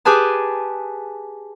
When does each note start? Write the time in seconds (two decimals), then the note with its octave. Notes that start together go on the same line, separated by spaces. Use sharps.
0.05 G4 G#4 B4 G#5 A5